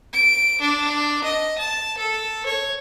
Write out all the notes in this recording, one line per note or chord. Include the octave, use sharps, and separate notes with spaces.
D7
D4
D#5
A5
A4
C#5